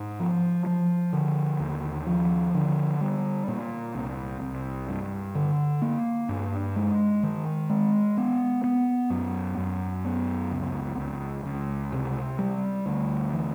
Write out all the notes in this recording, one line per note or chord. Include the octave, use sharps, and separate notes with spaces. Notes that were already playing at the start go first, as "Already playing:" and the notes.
Already playing: G#2
F3
F3
D3
D#2
F3
D3
G3
A#2
C2
C2
G2
D3
A#3
G2
G#3
D#3
G#3
B3
B3
F#2
F#2
B3
C#2
C#2
C#2
C3
G3
D2
E3